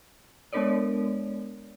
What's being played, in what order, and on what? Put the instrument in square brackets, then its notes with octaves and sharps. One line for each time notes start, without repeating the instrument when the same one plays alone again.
[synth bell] G#3 B3 D4 A#4 C#5 D5